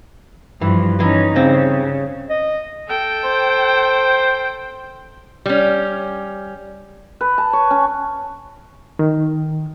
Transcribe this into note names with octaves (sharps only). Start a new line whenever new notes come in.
G2 E3 F3
E3 C#4 D#4
G2 C#3 C4
D#5
A4 G5
C5
G3 C#4
B4
A5
C#5
C#4
D#3